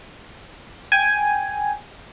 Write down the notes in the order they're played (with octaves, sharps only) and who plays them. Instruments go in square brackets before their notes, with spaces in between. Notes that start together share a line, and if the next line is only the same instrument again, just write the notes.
[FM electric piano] G5 G#5